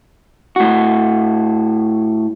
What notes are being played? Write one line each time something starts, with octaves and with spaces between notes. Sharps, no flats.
A2 F#4